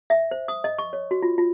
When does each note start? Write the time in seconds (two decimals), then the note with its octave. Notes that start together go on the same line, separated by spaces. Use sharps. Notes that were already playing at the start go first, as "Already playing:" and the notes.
0.10 E5
0.31 C5
0.48 D#6
0.64 D#5
0.79 C#6
0.93 C#5
1.11 F#4
1.23 F4
1.38 F4